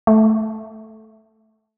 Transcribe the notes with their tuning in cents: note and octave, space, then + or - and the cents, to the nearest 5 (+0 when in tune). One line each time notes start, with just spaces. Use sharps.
A3 -5